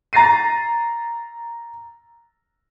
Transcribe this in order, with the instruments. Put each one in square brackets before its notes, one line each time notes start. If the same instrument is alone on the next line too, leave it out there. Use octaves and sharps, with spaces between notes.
[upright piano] A#5 A6 A#6 C7 D#7